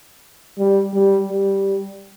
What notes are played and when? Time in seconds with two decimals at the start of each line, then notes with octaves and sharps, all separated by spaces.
0.58 G3
0.94 G3
1.29 G3